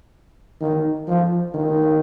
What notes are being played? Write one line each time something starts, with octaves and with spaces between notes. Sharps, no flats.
D#3
F3
D#3